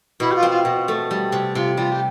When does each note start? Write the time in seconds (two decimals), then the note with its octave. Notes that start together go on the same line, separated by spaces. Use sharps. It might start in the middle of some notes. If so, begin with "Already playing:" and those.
0.20 B2 E4
0.31 G4
0.35 F4
0.43 C4
0.50 F4
0.65 B2
0.88 A3
1.11 G3
1.32 C3
1.55 C3 F4
1.77 G3 F4
1.91 G4